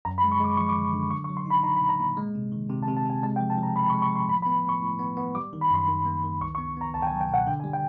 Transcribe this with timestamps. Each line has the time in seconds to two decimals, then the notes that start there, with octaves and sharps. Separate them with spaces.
0.05 F#2 A#5
0.18 B5
0.23 G#3
0.32 C#6
0.40 G#3 D6
0.57 F3 C#6
0.69 D6
0.76 D3
0.93 D3
1.11 F#3 C#6
1.24 C#6
1.29 F#3
1.37 C6
1.46 D#4 B5
1.63 D#4 A#5
1.76 B5
1.81 A#2
1.89 A#5
1.99 A#2
2.17 G#3
2.35 C3
2.52 D#3
2.69 C3
2.83 A5
2.87 C3
2.96 A5
3.05 C3 G#5
3.23 G#3 A5
3.36 G5
3.40 F3
3.50 A5
3.58 F3
3.63 A#5
3.76 F3 B5
3.90 C#6
3.93 G#3
4.02 C#6
4.12 F3 C6
4.28 A2 B5
4.42 B5
4.46 B3
4.65 A2 C#6
4.82 A2
4.99 B3
5.17 B3
5.35 G3 D6
5.53 D#3
5.61 B5
5.71 F#2 C6
5.88 D#3
6.05 A#3
6.23 D#3
6.41 C#2 C#6
6.55 C#6
6.58 B3
6.77 B3 A#5
6.94 C#2 A5
7.02 G5
7.07 G#5
7.11 F#3
7.21 G5
7.29 B2 F#5
7.47 D3 G5
7.60 G#5
7.64 G3
7.73 G5